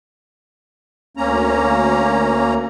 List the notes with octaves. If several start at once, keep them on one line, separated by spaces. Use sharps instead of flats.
D2 A#3 C#4 A#5